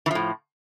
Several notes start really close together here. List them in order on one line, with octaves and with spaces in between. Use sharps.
E3 F3 A2